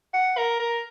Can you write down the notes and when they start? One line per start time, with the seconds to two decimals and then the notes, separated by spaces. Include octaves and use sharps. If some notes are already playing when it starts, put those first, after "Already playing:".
0.14 F#5
0.37 A#4
0.60 A#4